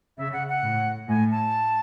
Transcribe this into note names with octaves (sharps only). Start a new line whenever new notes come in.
C#3 E5
F#5
F#5
A2
A2 G#5
A5